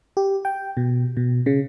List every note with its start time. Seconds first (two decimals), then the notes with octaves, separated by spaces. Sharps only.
0.17 G4
0.45 G5
0.77 B2
1.17 B2
1.46 C#3